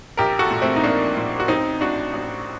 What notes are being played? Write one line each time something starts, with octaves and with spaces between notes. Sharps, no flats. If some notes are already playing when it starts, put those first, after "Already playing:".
A#1 G4 A#4
F#4 A4
A#2
A3 C4
D#4
A#1 A#3 D4
A#2
F#4
A1 C4 D#4
A2 D4 F#4
A1